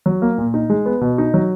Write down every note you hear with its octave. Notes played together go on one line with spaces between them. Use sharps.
F#3
A#3
A#2
D#4
G#3
B3
B2
D#4
F#3